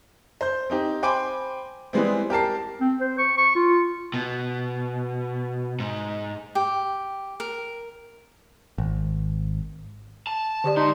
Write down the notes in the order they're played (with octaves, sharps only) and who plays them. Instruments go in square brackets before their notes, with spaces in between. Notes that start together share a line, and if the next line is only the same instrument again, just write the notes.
[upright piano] C5 G6
C4 D#4 G4
C5 G5 G#5 B5 C6 D6
E3 G3 G#3 B3 C4
G4 A#4 A5 C7
[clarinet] C4
C5
C#6
C#6
F4
[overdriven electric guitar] B2
G#2
[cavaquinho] G4
A#4
[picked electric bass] G#1
[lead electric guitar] A5
[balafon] D3 G4 D5
[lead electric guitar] G#2 C6 [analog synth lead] D#4